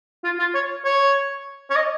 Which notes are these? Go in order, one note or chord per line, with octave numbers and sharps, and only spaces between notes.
F4
F4
C#5
C#5
C#5
D#5